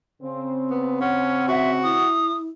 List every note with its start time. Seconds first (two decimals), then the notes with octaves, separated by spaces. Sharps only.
0.22 C#3 C4
0.70 B3
1.01 C#4 F#5
1.48 F#4 E5
1.83 E4 D#6